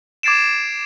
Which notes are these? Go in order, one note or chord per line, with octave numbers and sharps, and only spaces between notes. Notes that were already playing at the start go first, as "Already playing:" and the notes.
D6 G#6 A6 C7 D7 E7